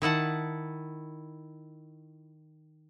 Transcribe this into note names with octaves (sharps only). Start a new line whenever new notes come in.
D#3 E4 F#5 A5